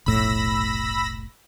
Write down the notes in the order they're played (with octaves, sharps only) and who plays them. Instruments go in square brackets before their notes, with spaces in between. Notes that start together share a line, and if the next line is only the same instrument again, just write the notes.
[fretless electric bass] F1 B1 A2 [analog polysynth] B5 E6 A#6